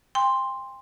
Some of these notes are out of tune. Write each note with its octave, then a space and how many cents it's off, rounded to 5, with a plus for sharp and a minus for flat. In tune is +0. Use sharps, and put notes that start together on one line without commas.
G5 +40 C6 +0